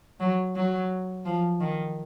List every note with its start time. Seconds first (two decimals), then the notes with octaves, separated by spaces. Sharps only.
0.20 F#3
0.55 F#3
1.25 F3
1.60 D#3